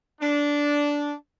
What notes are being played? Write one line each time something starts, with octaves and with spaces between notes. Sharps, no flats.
D4